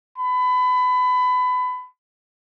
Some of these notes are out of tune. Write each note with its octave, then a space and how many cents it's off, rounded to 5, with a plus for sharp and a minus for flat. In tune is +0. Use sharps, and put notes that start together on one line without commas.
B5 +25